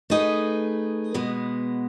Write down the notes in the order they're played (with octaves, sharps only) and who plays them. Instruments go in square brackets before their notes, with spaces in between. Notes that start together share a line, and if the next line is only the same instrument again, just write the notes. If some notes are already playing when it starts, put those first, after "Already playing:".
[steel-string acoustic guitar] A3 D#4 G#4 B4
B2 G#3 B3